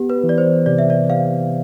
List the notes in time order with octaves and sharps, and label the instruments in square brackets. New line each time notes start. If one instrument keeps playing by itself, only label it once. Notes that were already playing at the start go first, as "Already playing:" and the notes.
Already playing: [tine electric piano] B3 [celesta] G4
[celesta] B4
[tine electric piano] E3
[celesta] D5
C5
[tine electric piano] C3 [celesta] D5
[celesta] E5
D5
[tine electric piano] C3 [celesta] F5